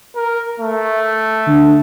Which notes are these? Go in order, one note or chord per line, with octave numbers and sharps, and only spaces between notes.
A#4
A3
D3